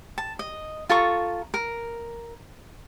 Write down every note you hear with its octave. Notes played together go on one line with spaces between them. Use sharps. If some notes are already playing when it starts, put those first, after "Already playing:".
A5
D#5
F4 A4 A#5 C#6
A#4